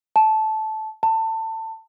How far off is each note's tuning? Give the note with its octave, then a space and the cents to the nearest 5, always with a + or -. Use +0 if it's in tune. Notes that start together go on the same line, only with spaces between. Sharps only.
A5 -15
A5 +25